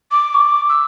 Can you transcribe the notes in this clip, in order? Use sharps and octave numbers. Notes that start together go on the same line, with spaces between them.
D6
C#6
D6
E6